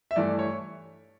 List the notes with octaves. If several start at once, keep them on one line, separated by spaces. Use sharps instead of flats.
E5
G2 E3 A3 D5
C#5